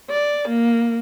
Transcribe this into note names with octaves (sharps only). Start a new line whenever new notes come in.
D5
A#3